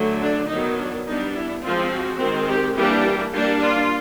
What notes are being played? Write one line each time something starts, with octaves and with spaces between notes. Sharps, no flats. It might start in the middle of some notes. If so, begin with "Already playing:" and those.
Already playing: D3 F#3 A3
D4
D#3 F#3 B3 D#4
D4
G3 B3 D4 D#4
E4
F3 G#3 C4 F4
F#4
D#3 G#3 C4
G4
E3 G3 A#3 D4 G4
G3 A#3 D4 G4
F4